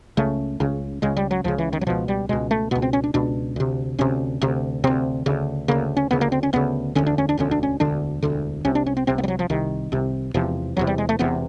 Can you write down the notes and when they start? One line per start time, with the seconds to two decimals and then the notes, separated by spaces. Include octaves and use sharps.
0.17 C#2 C#3 A3
0.60 C#2 C#3
1.02 C#2 C#3 G#3
1.17 G3
1.31 F#3
1.44 C#2 C#3 F3
1.58 E3
1.73 D#3
1.81 F#3
1.87 C#2 B2 F3
2.08 G3
2.29 C#2 B2 G#3
2.51 A3
2.71 C#2 B2 B3
2.82 C4
2.93 C#4
3.04 D4
3.14 C#2 B2 D4
3.56 D2 C3
3.99 D2 C3 C#4
4.42 D2 C3
4.84 D2 C3 C4
5.26 D2 C#3
5.68 D2 C#3 A#3
5.97 C#4
6.11 D2 C#3 B3
6.21 A#3
6.32 C4
6.43 C#4
6.53 D2 C#3 B3
6.95 E1 D2 D3 C#4
7.07 D4
7.18 C#4
7.29 D4
7.38 E1 D2 D3 C#4
7.51 D4
7.63 C#4
7.80 E1 D2 D3 D4
8.23 E1 D2 D3
8.65 C2 C3 C#4
8.75 D4
8.86 C#4
8.97 C4
9.07 C2 C3 C4
9.18 B3
9.24 G3
9.28 F#3
9.39 F3
9.50 C2 C3 D#3
9.92 C2 C3
10.34 E1 E2 C3 F3
10.77 E1 E2 C3 F#3
10.87 G3
10.98 G#3
11.09 A3
11.19 E1 E2 C3 B3